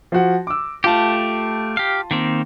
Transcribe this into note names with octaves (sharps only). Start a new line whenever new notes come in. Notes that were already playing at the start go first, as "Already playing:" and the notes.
F3 F#4
D6 E6
A3 F4 G4 A5
G4 F5
D#3 A#3 C4